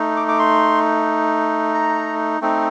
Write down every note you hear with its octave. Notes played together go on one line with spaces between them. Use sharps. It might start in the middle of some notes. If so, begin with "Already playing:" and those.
Already playing: A3 D#4
D6
D6
C6
A#5
A3 C4 D#4